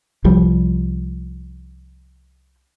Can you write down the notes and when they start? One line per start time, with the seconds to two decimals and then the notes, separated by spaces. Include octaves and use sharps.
0.24 C2 F3 G3